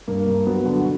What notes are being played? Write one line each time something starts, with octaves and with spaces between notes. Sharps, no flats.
G2 A#3
G2
F#3 B3
D3
F#4